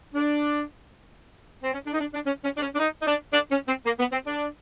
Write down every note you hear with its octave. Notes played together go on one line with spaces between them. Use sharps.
D4
C4
C#4
D4
D#4
D4
D4
C#4
C#4
D4
C#4
D4
D#4
D#4
D4
D4
C#4
C4
A#3
B3
C4
D4